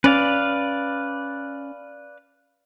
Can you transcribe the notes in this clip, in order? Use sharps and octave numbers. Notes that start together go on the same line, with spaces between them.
C#4 B4 D5 F5